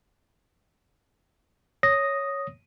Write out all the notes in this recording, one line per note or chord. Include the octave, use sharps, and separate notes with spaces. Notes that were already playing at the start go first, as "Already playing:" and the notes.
C#5 D#6 A#6